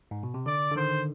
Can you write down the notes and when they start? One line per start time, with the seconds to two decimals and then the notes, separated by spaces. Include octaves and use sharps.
0.11 G#2
0.23 B2
0.34 C3
0.46 D3 D5
0.71 D3
0.76 D#3 C5